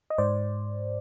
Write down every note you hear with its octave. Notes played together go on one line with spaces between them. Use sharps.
D#5
G#2 C5 D5